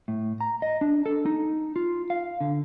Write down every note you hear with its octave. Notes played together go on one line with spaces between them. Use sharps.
A2
A#5
D#5
D4
A4
D#4
F4
F5
D3